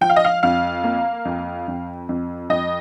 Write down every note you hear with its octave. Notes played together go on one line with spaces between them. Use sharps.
F3 G5
F5
D#5
F5
F2 F5
A#3
F2
F2
F2
F2 D#5